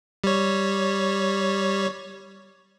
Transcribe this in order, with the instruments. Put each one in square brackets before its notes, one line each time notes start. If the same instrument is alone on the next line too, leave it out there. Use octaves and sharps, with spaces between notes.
[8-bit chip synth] G3 C#5